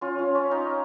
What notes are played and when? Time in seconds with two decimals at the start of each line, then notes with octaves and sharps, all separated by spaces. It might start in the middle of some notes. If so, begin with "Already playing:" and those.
0.01 C#4 F4
0.19 C#4
0.35 C#4
0.51 D#4